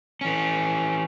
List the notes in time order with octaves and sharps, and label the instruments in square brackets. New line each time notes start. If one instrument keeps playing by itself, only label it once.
[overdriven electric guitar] E3 C#4